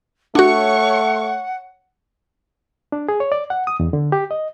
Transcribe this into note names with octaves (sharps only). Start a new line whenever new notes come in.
A3 D4 F#4 C#5 F#5 C#6
D4
G#4
C#5
D5
F#5
D#6
E2
D3
G4
D#5